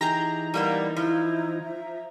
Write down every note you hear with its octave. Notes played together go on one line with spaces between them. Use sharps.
E3 D#4 G4 G#4 A#5
G3 A#3 B3 D5
F3 E4
E5